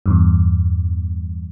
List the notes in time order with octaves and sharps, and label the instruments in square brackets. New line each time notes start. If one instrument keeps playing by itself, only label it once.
[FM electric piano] E2 G2